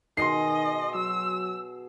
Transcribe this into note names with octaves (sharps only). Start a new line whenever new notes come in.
B2 D#3 G#4 D#5 C6 C7
F#3 E6